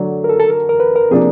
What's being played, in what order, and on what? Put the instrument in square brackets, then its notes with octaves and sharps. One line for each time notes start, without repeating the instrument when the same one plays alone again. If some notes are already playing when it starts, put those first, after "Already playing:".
Already playing: [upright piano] D3 F#3 A3 D4
[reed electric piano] A#4
A4
A4
A#4
A#4
B4
A#4
[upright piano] C3 F3 A#3 D4 [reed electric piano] G#4